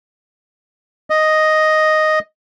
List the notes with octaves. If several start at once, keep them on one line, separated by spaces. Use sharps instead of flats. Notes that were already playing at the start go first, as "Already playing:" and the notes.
D#5